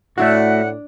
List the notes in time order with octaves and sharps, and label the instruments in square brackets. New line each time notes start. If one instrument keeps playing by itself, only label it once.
[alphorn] A2 [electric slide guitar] A3 E4 F#4 [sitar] D4 [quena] F#5